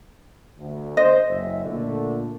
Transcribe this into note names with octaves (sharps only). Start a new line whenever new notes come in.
D2
C5 D#5
F#1 F#2 E5
A#2 D3 A3